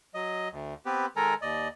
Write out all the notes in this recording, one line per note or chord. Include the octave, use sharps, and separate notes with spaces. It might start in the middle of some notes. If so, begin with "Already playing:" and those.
F#3 D#5
D2
B3 C4 G4 B4
D#3 G#3 A4 A#4 G#5 A#5
D#2 D5 D#5